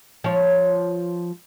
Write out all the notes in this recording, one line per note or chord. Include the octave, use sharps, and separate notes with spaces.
F3 C#5